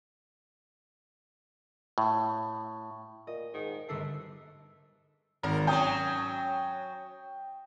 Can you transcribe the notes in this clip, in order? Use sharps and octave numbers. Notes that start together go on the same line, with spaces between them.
A2
A#2 D#5
G#2 D#3
G1 A3 D4 A4 C7
G#1 A#4
F#3 C#4 G5 D#6